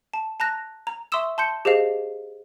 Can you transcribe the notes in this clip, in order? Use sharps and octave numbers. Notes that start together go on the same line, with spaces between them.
A5
A5 A#5 F#6 A#6
A#5
E5 C6 C#6 D#6 E6 E7
A5 C6 G6 C#7
G4 G#4 C5 D#5 F5